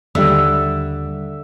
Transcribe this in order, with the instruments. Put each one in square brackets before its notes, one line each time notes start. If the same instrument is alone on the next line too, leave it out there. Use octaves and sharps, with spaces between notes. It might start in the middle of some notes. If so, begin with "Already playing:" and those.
[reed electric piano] D#2 G3 [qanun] D3 [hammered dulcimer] E5